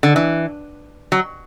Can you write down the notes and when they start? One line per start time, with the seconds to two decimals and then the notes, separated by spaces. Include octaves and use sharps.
0.03 D3
0.16 E3
1.12 F#3